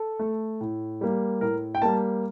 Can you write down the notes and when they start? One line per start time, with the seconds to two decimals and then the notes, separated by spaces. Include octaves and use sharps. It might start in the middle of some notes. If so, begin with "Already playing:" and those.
Already playing: A4
0.19 A3
0.61 A2
1.01 G3 A#3
1.41 A2 A#4
1.75 G5
1.82 G3 A#3 A5